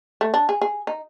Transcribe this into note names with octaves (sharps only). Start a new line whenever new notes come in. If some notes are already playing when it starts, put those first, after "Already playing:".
A3
D4
G#4
G#4
D#4